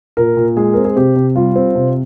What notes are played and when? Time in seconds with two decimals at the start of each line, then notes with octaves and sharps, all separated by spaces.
0.17 A#2 A#4
0.37 A#2
0.57 G#3 G#4
0.74 C4 A#4
0.85 G#4
0.96 C3 G4
1.16 C3
1.35 G3 F4
1.56 C4
1.75 C3